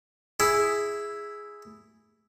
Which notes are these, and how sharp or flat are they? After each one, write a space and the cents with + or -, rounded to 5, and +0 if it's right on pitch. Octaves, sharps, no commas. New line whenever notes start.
E4 +0 G#4 +0